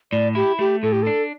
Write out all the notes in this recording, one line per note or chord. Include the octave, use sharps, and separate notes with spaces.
A2 D5
E4 G4
A3 G4
A2 A4
G4
D4 A4